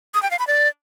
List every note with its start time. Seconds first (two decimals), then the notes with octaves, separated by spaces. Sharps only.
0.14 D#6
0.23 G5
0.31 F5
0.39 B5
0.47 D5